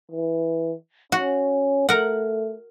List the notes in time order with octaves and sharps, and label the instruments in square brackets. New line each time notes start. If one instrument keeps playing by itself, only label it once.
[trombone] E3
[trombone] C#4 [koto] F#4
[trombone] A3 [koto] A#4 F#5